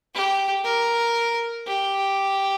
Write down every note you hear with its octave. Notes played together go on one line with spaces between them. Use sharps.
G4
A#4
G4